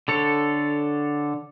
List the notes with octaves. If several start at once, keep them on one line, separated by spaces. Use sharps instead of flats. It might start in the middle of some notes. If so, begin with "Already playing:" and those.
D3 A4 C#5